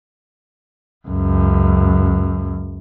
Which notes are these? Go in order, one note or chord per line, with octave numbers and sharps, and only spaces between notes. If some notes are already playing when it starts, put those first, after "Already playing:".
C#2 F#2